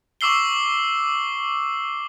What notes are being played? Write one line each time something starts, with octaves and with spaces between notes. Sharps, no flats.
C#6 D6 E6 C7 G7